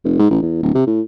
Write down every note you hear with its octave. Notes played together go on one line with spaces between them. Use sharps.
F1
G#2
A1
E2
D1
C3
A2